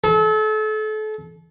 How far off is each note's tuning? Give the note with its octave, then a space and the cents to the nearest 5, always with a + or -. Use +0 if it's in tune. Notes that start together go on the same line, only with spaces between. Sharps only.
A4 -35